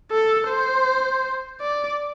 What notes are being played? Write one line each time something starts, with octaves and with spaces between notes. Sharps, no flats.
A4
C5
D5